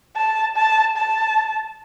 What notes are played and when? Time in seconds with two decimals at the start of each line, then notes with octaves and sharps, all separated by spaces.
0.16 A5
0.56 A5
0.97 A5